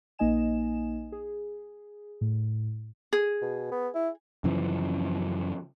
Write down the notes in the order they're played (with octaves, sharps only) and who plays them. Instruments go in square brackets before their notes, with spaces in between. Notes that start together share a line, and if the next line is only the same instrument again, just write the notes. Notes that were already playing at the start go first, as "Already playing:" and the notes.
[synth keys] A#1 A#3 D#4 D#5 G#5 E7
G#4
A2
[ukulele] G#4
[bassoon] B2
B3
E4
[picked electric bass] F#2 C#3 E3 F3